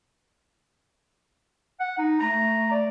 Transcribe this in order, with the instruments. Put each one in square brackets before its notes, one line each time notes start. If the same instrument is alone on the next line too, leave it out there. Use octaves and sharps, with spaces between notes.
[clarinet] F#5
D#4
[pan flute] A3 [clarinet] A#5
[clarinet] D5